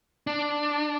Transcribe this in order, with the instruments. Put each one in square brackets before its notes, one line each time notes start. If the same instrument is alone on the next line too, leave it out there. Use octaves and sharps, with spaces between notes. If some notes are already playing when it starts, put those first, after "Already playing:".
[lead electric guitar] D4